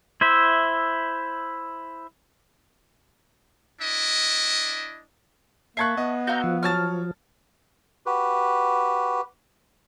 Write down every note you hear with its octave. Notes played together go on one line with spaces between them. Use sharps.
E4 C5 E5
D4 E4 D#5
A#3 E5 A5 C#6 F#6 G#6 C7
B3 D#5
F#4 F5 A#5 E6 G6
F3
F#3 C#5 A5 D#6 F6 A6
F#4 G4 B4